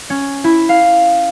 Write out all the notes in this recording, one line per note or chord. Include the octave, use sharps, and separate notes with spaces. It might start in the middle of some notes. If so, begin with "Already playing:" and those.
C#4
E4
F5